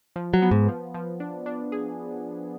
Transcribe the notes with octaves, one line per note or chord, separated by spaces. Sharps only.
F3
F#3
B3
G#2
F3
F3
D4
D4
G#4